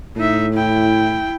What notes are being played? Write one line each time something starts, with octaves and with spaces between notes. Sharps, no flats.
A2 D#4 E5
E4 G5